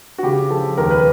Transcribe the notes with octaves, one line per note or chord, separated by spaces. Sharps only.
F#4
C#3 G4
F3 A4
D#2 A#4
B4